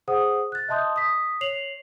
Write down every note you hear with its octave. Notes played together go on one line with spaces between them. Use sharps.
G#4 C5 F#5 D#6
F#6 A6
D#5 E5 A5 C6 D#6 G6
D#6 B6
C#5 C7 F7 F#7